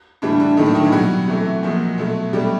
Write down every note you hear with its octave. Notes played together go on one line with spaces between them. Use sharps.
A2 D3 E3 G3 D4
D3 D4
A2 D#3 F#3 A3 D#4
D3 D4
D#3 D#4
E3 E4
B2 F#3 G3 F#4
C3 E3 A3
A#2 F3 G#3
B2 F#3 A3
B2 F#3 G3 A3 G4